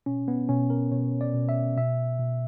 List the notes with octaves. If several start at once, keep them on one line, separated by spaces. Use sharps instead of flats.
B2 C#4
B3
B2 C#4
A#4
B2 C#5
D5
B2
E5
B2 E5
B2